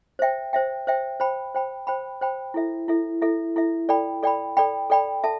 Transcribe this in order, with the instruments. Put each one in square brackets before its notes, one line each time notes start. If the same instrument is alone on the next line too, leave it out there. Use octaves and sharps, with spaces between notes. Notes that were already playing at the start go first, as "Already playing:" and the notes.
[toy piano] C5 E5 G5
C5 E5 G5
C5 E5 G5
C5 G5 B5
C5 G5 B5
C5 G5 B5
C5 G5 B5
E4 A4 E5
E4 A4 E5
E4 A4 E5
E4 A4 E5
A4 D5 G5 B5
A4 D5 G5 B5
A4 D5 G5 B5
A4 D5 G5 B5
A4 E5 A5